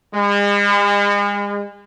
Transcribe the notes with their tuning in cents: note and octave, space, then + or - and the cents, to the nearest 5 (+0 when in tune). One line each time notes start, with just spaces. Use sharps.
G#3 -40